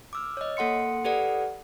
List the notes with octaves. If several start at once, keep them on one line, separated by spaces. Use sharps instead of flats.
D6 E6 F6
C#5 D#5
A#3 A4 F#5 C6 C#7
G4 A4 B4 D5 F#5